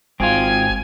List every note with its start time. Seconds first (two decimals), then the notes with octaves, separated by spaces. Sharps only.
0.20 G#1 G#3 C4 F4 F#4 G#5